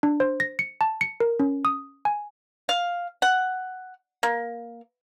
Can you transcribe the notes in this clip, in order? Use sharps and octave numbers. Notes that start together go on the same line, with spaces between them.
D4
C5
A#6
C#7
A5
C#7
A#4
C#4
D#6
G#5
F5
F#5
A#3